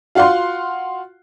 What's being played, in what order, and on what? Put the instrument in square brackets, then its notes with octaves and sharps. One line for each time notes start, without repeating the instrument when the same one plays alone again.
[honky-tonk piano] F4 F#4 F5 F#5 C6